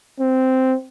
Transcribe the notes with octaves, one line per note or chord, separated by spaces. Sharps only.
C4